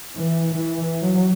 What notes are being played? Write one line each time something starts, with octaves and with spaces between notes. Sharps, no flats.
E3
E3
F#3